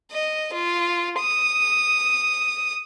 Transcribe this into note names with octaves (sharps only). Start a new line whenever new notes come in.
D#5
F4
D#6